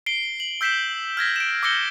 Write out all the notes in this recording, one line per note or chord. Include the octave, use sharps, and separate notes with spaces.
C7 D7 G7
F#7
E6 G6 B6 C7 E7 G7
F6 G#6 A#6 B6
D7 E7
D6 E6 G6 A#6 C#7 G7